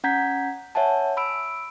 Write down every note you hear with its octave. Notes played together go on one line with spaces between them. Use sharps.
C#4 F#5 A#5 G6 G#6 B6
C#5 E5 F#5 G#5 A5
B5 E6 D7